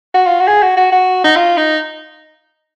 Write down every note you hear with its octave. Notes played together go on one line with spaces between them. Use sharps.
F#4
F4
F#4
G#4
F#4
F#4
F#4
D#4
F4
D#4